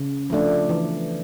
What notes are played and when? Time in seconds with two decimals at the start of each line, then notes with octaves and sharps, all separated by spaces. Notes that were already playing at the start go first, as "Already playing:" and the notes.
Already playing: C#3
0.30 F3 A3 D4
0.69 E3